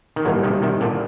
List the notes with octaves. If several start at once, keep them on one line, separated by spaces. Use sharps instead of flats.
D#3
A2 D3 F#3 G3 A#3
C3 D#3
C3 D#3
A#2 D3